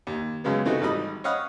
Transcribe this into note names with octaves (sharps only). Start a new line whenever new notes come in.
D#2
F#2 C#3 G#3 B3
C3 E3 A3 D#4 F#4
G#1 G3 D#4 D#5 B5
C#5 D#5 F5 F#5 B5 C#6